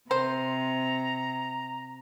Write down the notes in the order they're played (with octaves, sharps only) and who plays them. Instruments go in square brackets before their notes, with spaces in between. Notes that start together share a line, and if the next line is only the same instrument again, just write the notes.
[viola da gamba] C3 [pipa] C5 [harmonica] A#5